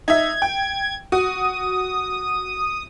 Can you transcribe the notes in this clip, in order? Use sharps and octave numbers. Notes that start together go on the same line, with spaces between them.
D#4 E5 G#6
G5
F#4 D#6